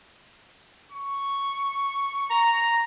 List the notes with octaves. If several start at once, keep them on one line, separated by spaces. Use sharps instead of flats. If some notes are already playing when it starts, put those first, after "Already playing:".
C#6
A#5